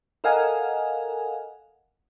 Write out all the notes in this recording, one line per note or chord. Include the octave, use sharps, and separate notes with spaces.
A4 A#4 D#5 F5 F#5 G#5